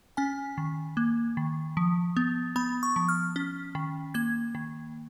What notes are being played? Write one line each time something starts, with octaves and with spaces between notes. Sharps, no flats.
C#4 G#5
D#3
A#3
D#3
F3
B3
B3 B5
C#6
F3
F6
C#4
D#3
A#3 G#6
D#3